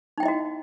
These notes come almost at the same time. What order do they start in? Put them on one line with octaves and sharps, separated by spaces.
D#4 G5 E4 D#5 F#4